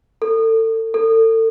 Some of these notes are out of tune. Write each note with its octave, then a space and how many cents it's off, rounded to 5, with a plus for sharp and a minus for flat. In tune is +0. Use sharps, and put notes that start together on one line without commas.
A4 +30
A4 +35